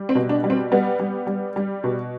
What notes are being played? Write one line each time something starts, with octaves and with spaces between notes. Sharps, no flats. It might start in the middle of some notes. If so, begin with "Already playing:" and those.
Already playing: G3
C4
B2
D4
G3
C4
G3 B3
G3
G3
G3
B2